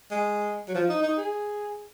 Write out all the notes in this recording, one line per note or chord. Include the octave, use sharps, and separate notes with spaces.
G#3
F#3
F3
D#4
D#4
G#4